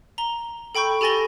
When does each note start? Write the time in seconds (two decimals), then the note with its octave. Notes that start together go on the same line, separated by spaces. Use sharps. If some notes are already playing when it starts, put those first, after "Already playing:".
0.18 A#5 G7
0.75 A4 G5 B5 C#6 G6
1.01 G4 A4 G#5 A6 A#6 G7